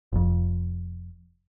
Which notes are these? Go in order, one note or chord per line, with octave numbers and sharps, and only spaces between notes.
F1 F2